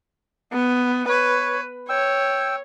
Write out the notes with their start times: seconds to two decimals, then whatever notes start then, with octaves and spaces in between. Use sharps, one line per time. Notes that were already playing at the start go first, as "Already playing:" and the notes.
0.52 B3
1.09 B4 C#5
1.89 C#5 G5 E6